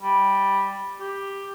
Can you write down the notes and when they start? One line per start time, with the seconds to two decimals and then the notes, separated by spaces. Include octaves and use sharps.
0.02 G3
1.00 G4